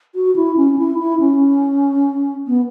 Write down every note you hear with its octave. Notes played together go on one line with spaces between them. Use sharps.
F#4
E4
C#4
E4
E4
C#4
B3